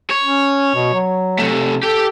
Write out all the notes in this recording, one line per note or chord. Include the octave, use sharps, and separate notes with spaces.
C#5
C#4
B2
F#3
C3 A3
G4 A4 G5